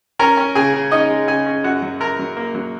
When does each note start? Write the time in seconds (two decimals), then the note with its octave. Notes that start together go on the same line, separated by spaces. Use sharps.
0.19 C#4 A#4 A#5
0.37 C#4
0.55 C#3 G#4 G#5
0.74 C#3
0.91 C#4 D#4 D#5
1.10 G#3
1.28 C#3 G#4 G#5
1.46 C#4
1.64 F#2 F#4 F#5
1.82 F#3
2.00 F#2 A#4 A#5
2.19 F#3
2.37 A#3
2.55 F#3